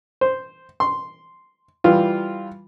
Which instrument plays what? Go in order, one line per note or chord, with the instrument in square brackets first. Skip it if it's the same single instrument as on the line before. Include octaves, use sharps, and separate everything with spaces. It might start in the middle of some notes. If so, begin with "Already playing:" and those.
[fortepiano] C5
C6
E3 G3 F4